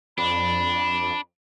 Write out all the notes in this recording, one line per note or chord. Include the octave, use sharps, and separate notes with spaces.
F2 D4 B5